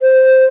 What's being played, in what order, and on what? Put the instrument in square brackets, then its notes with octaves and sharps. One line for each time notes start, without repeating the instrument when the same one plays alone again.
[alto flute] C5